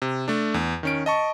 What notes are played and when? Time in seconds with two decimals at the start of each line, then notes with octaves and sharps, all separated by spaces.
0.02 C3
0.28 A3 D4
0.54 E2
0.83 D#3 C#4 D7
1.06 D#5 A5 C#6